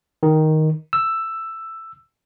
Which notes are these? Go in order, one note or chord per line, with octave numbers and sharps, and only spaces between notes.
D#3
E6